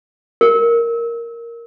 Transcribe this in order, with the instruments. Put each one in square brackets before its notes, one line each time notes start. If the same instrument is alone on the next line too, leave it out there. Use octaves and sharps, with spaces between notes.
[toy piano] A#4